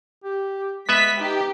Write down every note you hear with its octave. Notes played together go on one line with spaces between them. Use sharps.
G4
G#3 B3 B4 E5 B6
D#4 G4